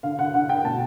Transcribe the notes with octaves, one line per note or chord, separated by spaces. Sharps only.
D3 F5
D3 F#5
D3 F#5
D3 G5
B2 A5